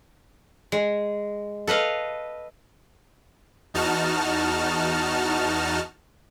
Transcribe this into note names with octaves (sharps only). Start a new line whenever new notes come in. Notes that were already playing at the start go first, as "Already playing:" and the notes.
G#3
A4 B4 D#5 F5
E2 D#4 F#4 A5 F6